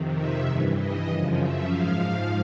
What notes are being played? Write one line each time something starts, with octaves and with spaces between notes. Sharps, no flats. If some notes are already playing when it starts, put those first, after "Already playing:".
Already playing: F2 C3 D#3
E5
G2 E3
D#5
F#2 C#3 F3
E5
G#2 F3 F5